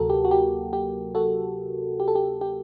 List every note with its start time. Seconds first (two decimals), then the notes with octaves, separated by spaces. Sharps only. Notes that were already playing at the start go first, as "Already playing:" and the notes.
Already playing: D2 C3 F#3 A#3 F#4 A4 A#4
0.10 G4
0.25 F#4
0.31 G4
0.73 G4
1.15 F#4 A4
2.00 G4
2.08 A4
2.15 G4
2.41 G4